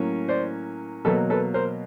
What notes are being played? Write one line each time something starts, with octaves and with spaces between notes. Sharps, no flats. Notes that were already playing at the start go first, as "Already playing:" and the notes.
Already playing: A2 F#3 A#3 C#4
C5 D5
B2 F#3 A#3 A4 B4
A4 B4
A#4 C5